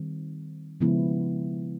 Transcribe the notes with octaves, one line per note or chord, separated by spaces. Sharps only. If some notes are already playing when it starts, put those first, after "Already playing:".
Already playing: D#3 G3 C4
C#3 F3 G#3 B3 E4